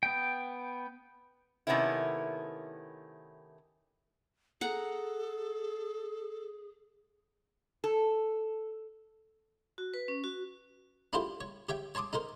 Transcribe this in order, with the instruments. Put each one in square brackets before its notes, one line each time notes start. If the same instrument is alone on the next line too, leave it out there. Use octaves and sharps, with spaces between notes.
[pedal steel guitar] B3 G5
[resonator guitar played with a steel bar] C3 D#3 A3 B3 C#4 E4
[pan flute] G#4 [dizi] A4 [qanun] F#5 A#5
[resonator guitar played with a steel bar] A4
[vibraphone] F#4
B4
C#4
F#4
[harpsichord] D4 E4 F4 G4 A4 C5
C#5
G4 C#5 E5 G5
C#5 A5 C6 D6 D#6
D#4 A4 A#4 C5